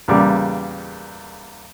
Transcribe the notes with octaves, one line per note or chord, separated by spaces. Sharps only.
E2 A#2 C#3 G3 D6